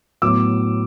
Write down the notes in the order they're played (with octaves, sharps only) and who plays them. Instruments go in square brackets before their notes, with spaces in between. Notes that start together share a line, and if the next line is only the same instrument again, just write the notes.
[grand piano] A2 F#3 B3 D6 E6